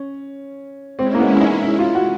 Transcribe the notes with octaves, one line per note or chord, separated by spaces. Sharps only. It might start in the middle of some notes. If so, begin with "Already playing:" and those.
Already playing: C#4
G#3 C4 C#4 E4
A#3
B3
D#4
E4
F4
F#4